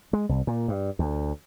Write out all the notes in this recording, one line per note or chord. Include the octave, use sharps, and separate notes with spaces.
G#3
C2
A#2
G2
D2